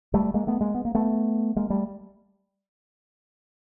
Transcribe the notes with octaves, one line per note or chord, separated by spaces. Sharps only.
G3 A3
G#3 A#3
A3 B3
G#3 A#3
B3
A#3
A3 B3
G#3 A#3
G3 A3